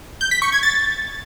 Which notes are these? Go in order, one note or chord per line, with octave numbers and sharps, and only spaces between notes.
G6
B6
C#6
G#6
A6